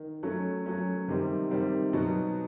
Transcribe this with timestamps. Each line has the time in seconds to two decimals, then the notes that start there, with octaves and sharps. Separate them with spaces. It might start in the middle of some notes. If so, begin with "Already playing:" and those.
Already playing: D#3
0.23 F#3 A3 C#4
0.66 F#3 A3 C#4
1.08 C3 D#3 G3 C4
1.51 C3 D#3 G3 C4
1.93 B2 F#3 B3 D#4